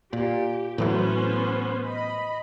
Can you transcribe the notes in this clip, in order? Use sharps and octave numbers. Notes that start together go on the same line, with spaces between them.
A#2 G4
A2 E3 F#3 B3 C#4 C5
D#5 B5